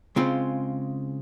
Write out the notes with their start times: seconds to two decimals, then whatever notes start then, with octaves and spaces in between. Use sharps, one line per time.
0.16 C#3 G#3 C4 F4